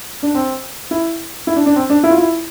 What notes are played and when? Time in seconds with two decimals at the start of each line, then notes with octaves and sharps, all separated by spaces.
0.23 D4
0.35 C4
0.91 E4
1.47 E4
1.56 D4
1.66 D4
1.76 C4
1.90 D4
2.03 E4
2.11 F4
2.18 E4